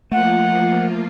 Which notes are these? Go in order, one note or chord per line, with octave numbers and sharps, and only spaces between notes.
F3 A3 A#3 F4 F#5